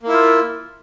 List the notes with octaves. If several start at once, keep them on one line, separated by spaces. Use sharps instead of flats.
A#3 E4 F4